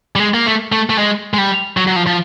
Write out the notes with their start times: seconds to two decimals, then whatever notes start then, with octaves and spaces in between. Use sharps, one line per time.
0.16 G3
0.19 G#3
0.34 A#3
0.46 A3
0.72 A3
0.90 A3
0.98 G#3
1.34 G#3
1.38 G3
1.77 F#3
1.87 F#3
1.96 F3
2.07 F3